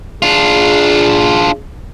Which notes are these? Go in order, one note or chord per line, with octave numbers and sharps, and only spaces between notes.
D4 F4 G#4